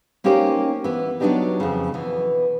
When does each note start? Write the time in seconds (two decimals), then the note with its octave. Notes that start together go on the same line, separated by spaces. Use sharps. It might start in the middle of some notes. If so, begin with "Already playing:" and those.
0.24 A#3 C#4 D#4 G4 A#4 C5
0.84 E3 B3
1.20 F#3 B3 C4 D4 D#4 G4
1.60 F2 C#3
1.94 B2 E3